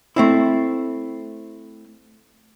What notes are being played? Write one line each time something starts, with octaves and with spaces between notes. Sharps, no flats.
A3 C4 E4